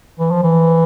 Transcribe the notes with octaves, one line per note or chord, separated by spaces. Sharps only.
E3
F3
E3